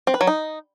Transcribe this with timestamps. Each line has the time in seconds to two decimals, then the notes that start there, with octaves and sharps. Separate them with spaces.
0.07 C4
0.14 B4
0.21 F#3
0.27 D#4